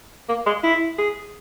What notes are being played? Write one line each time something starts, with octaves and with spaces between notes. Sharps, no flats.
A#3
G#3
E4
G#4